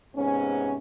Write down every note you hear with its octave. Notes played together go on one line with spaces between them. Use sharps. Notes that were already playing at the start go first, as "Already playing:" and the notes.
G#2 C3 B3 C#4